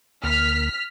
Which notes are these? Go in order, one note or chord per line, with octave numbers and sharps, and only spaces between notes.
D2 A#3 F6 B6